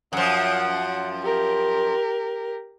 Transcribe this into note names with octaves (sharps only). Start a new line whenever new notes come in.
F#2 F3 F#5
G4 A#4